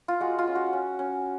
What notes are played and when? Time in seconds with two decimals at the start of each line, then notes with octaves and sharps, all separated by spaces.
0.08 F4
0.20 G#3 F#4
0.39 F4
0.47 C#4
0.55 F#4
0.73 C#4
0.99 C#4